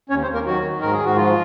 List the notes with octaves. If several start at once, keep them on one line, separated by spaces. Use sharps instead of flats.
D#2 C#4 C#5
C4 C5
D#2
A#3 A#4
D#3 F#3 F#4
D#3
G#2 A#4
G#4
G#2
F#4
F3 F4